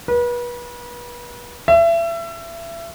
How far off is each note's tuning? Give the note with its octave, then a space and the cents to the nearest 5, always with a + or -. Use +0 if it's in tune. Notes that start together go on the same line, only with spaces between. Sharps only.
B4 -35
E5 +30